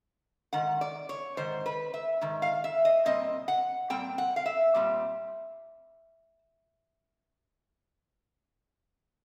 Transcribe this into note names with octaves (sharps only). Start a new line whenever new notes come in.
G#2 D#3 F#5
D5
C#5
G#2 D#3 C5
B4
E5
G#2 D#3
F5
E5
D#5
A#2 G3 C4 D#5
F#5
A#2 G3 C4 G5
F#5
F5
E5
A#2 G3 C4